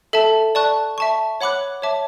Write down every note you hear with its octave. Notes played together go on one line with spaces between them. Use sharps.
A4 E5 A5
D5 A5 C#6 F#6
E5 A5 C#6
C#5 F#5 B5 D6 F#6
C#5 E5 A5 D6